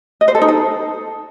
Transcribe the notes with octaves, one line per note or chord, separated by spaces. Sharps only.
D#5
C5
A4
D#4
A4